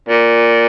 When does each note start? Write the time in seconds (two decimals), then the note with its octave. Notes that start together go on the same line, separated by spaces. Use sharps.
0.09 A#2